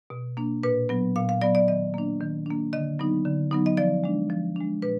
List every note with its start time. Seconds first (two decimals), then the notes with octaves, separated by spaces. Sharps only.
0.10 B2
0.37 A#3 D4
0.63 A#2 B4
0.89 F#3 B3
1.16 A#2 F5
1.29 F5
1.41 F#3 B3 D5
1.55 D5
1.68 D#3 D#5
1.94 A#3 D4
2.21 D#3
2.46 A#3 D4
2.73 D3 D#5
2.99 F#3 B3 D#4
3.25 D3
3.51 F#3 B3 D#4
3.66 D#5
3.77 F3 D5
4.04 G#3 D4
4.30 F3
4.56 G#3 D4
4.82 A#2 B4